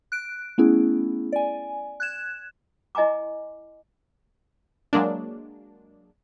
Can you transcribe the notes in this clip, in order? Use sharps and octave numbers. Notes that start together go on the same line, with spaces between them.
F#6 D7
A3 B3 C#4 E4 G#4
D5 G#5
F#6 G#6 E7
E4 D#5 G#5 A#5 D6
F#3 G#3 A#3 D4